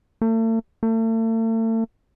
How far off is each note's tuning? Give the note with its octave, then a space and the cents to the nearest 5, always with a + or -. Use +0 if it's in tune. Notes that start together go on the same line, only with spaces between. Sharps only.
A3 +40
A3 +40